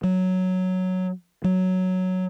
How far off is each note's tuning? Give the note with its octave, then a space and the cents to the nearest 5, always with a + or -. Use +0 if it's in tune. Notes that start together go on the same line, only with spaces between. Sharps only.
F#3 +0
F#3 +0